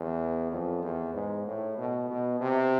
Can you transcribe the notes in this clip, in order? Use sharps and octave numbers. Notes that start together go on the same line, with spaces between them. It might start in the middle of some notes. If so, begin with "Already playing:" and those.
Already playing: E2
F2
E2
G#2
A2
B2
B2
C3